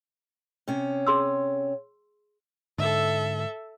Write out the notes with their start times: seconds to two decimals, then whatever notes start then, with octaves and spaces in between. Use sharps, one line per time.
0.68 C3 C#4
1.07 G#4 C6 E6
2.78 G#2 D3 A4 E5